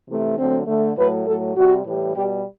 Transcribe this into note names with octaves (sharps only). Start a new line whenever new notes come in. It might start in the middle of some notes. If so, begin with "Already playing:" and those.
C3 E3 A3
D3 F#3 A3 C4
D3 A3
A2 F#3 A3 B4
A2 F#3 A3 A4
C3 G3 F#4
A2 E3 G3
B2 G3 G4